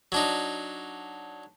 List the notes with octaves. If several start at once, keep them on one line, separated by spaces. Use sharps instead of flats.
F#3 D4 D#4